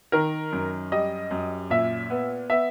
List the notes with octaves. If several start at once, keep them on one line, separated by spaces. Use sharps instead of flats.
D#3 A#4
F#2
G3 D#5
F#2
A#2 E5
B3
B3 E5